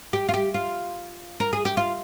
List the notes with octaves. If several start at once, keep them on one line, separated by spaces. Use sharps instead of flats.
G4
F4
G4
F4
A#4
G#4
G4
F4